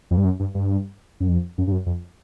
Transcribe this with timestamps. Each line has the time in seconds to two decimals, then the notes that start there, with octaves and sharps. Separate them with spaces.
0.11 F2
0.17 G2
0.25 F#2
0.40 G2
0.54 G2
1.20 F#2
1.29 F2
1.58 F#2
1.67 G2
1.72 F#2
1.86 F2